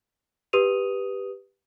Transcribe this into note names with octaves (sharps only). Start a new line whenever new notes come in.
G4 B4 D#6 D#7 F7